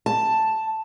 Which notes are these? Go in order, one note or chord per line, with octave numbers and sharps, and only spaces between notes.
A5